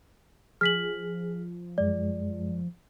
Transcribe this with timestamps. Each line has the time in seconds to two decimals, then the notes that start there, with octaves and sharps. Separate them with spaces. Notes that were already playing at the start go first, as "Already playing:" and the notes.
0.61 F3 G#4 F6 B6 F#7
1.78 F#2 G#3 D5